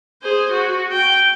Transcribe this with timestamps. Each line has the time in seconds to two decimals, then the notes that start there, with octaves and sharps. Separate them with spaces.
0.22 G#4 C5
0.51 F#4
0.92 G5